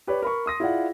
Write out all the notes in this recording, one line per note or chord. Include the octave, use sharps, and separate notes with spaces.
G4 B4 C#5 D5
A#4 B5 C#6
C6 D#6 A#6
E4 F4 G#4 D5 F5 F#5